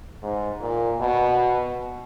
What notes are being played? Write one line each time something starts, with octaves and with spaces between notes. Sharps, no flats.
G#2
A#2
B2